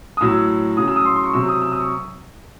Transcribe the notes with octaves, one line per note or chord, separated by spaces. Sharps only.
D#6
A2 F#3 E6
C#3 F#3 D#6
E6
D#6
C6
C6
C#6
C3 F#3 E6
D#6
E6
D#6
C#6